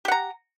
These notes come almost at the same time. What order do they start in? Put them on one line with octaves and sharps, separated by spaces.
G4 F#5 A#5